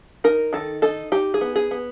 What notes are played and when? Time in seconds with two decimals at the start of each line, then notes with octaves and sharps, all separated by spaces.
0.24 D#4 A#4
0.53 D#3 A4
0.82 D#4 A4
1.12 D#4 G4
1.34 G#4
1.41 B3
1.56 G#4
1.71 B3